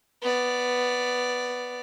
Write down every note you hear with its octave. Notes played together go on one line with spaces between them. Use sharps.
B3 D5